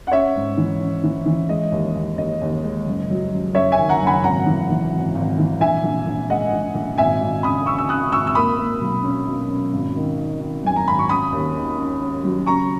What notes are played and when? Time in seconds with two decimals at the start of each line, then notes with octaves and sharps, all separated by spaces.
0.07 F#5
0.11 C#4 C#5 E5
0.36 G#2
0.57 E3
0.80 C#4
1.04 E3
1.26 E3
1.49 G#3 D#5
1.72 D#2
1.95 D#2
2.18 D#2 D#5
2.41 D#2
2.64 G#3
2.87 F#1
3.10 F#3
3.32 F#1
3.55 F#2 C#5 E5
3.72 E5 G#5
3.78 D#3
3.89 F#5 A#5
4.01 F#1
4.07 G#5 B5
4.24 G#1 F#5 A#5
4.46 E3
4.70 E3
4.93 G#1
5.15 G#1
5.38 E3
5.60 A#1 E5 G#5
5.83 A#1
6.06 A#1
6.30 G#3 D#5 F#5
6.52 A#1
6.75 A#1
6.97 G#1 E5 G#5
7.20 G#1
7.43 C#3 B5 D#6
7.66 C#3 C#6 E6
7.78 E6
7.89 C#3 D#6 F#6
8.12 G#1 C#6 E6
8.27 E6
8.35 A#3 B5 D#6
8.57 A#3
8.81 B1
9.03 C#4
9.26 B2
9.50 C#4
9.73 G#1
9.96 D#3
10.18 D#3
10.40 D#3
10.64 F#2 G#5
10.76 A#5
10.87 G#1 B5
10.99 C#6
11.09 C#4 B5 D#6
11.32 D#2
11.55 D#3
11.78 C#4
12.01 C#4
12.24 F#3
12.46 C#3 A#5 C#6